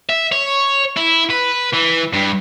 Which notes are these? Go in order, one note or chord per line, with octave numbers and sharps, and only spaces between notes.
E5
C#5
E4
B4
E3
G2